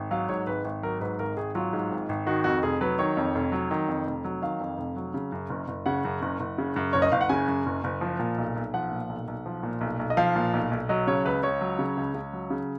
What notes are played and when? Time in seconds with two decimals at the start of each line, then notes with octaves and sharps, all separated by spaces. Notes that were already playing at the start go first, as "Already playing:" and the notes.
Already playing: G#1
0.11 F#3 F5
0.29 G#2 C#5
0.47 G#1 B4
0.65 G#1
0.83 F#3 A#4
1.01 G#2 B4
1.19 G#1 A#4
1.37 G#1 G#4
1.55 F#3 F4
1.73 G#2
1.91 G#1
2.09 G#1
2.26 D#3 F#4
2.44 F2 F#4
2.63 F1 G#4
2.81 F#3 B4
2.99 D#3 C#5
3.17 F2
3.35 F1
3.52 F#3
3.71 D#3
3.88 F2
4.07 F1
4.24 F#3
4.42 D#3 F5
4.60 F2
4.78 F1
4.96 F#3
5.14 C#3
5.32 F#2
5.50 F#1
5.68 F#1
5.86 C#3 F#5
6.05 F#2
6.22 F#1
6.40 F#1
6.58 C#3
6.76 F#2
6.93 F#1 C#5
7.02 D#5
7.12 F#1 F5
7.21 F#5
7.29 C#3 G#5
7.48 F#2
7.66 F#1
7.84 F#1
8.01 F3
8.19 A#2
8.38 B1
8.56 B1
8.74 F3 F#5
8.92 A#2
9.09 B1
9.28 B1
9.46 F3
9.63 A#2
9.81 B1
9.99 B1
10.10 D#5
10.17 F3 F5
10.36 A#2
10.53 B1
10.71 B1
10.89 F#3 D#5
11.07 C#3 C#5
11.25 C#2 B4
11.43 C#2 C#5
11.61 F#3
11.79 C#3
11.97 C#2
12.14 C#2
12.33 F#3
12.50 C#3